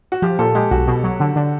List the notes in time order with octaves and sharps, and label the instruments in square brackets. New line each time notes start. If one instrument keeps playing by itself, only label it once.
[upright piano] F#4
[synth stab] F3 [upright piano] G4
[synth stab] A#2 [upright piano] A4
[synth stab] G#3 [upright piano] G4
[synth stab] B1 [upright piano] F#4
[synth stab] B2
F#3
D3
D3